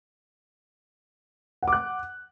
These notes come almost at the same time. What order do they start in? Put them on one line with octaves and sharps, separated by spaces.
F#5 D6 F#6